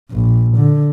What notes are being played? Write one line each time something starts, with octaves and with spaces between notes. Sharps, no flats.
A#1
D3